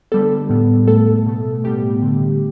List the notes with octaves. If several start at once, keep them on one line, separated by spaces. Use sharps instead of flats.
D3 G3 B3 A4
A2 G3 B3
A2 A3 A4
B2 A3
A2 G3 B3 G4
D3 A3